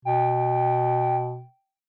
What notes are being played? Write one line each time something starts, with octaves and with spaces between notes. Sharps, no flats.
B2 G5